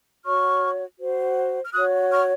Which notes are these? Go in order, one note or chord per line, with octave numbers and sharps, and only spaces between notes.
F#4 C#5 C#6 F6
F#4 C5
F6
F#4 C#5 D#6 F#6
C#6 F6